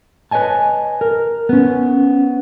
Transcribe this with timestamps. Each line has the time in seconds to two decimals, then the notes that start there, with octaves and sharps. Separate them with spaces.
0.31 B4 C#5 D#5 G#5 A5
1.01 A#4
1.49 B3 C#4